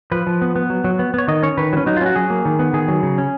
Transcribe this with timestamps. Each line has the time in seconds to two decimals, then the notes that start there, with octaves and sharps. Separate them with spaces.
0.11 F3 B4
0.27 F3
0.42 B3
0.56 B3
0.70 F#3
0.84 F#3
0.99 B3
1.14 B3 C#5
1.28 D#3 D#5
1.43 C#4 C#5
1.57 D#3 B4
1.73 F#3
1.77 C#4
1.86 F#3 D#4
1.97 F4
2.01 C#4 F#4
2.16 F#3 G#4
2.30 A#3
2.45 D#3
2.59 B3
2.73 D#3 G#4
2.88 F#3
3.03 C#3
3.18 C#4